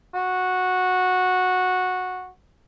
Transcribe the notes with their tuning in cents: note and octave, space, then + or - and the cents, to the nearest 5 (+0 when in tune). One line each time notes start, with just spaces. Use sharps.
F#4 -10